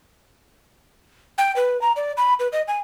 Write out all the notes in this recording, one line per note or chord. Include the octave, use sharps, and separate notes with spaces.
G5
B4
A#5
D5
B5
B4
D#5
G#5